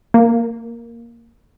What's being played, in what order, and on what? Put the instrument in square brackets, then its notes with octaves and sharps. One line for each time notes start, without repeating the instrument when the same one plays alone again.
[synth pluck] A#3